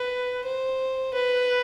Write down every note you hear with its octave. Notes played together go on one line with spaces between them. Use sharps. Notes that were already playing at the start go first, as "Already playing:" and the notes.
Already playing: B4
C5
B4